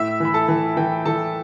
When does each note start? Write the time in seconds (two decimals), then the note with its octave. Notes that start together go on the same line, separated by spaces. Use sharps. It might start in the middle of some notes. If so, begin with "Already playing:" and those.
Already playing: A2 E5 E6
0.20 E3 B5
0.34 A4 A5
0.48 E3
0.77 E3 G5
1.05 E3 A4 A5